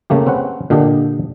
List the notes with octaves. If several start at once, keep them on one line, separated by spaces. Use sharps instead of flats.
C#3 A3 A#3 G4
C4 C#4 B4 F#5
A#2 D3 D4 G4 D#5